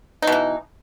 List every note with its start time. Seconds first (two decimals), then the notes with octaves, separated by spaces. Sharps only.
0.22 D#4
0.27 B2
0.32 E3